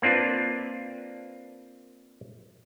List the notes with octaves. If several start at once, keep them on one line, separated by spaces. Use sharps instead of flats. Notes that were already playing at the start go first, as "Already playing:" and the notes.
A#3 C4 D4 F4 B4